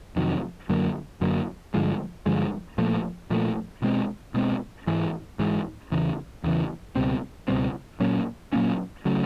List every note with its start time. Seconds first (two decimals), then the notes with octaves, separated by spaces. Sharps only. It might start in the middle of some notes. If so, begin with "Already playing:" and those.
0.16 F2 C3 D#3 F#3
0.69 F#2 D3 F#3 A#3
1.21 F#2 D3 F#3 A#3
1.74 G2 D3 F3 G#3
2.26 G2 D3 F3 G#3
2.78 A#2 F3 A3
3.30 A#2 F3 A3
3.82 B2 G#3 C4
4.34 B2 G#3 C4
4.87 G#2 E3 G#3
5.39 G#2 E3 G#3
5.91 E2 C#3 E3
6.44 E2 C#3 E3
6.95 C#2 B2 G3 C4
7.48 C#2 B2 G3 C4
8.00 A#2 F#3 A#3 C#4
8.53 A#2 F#3 A#3 C#4
9.05 C#3 F#3 A3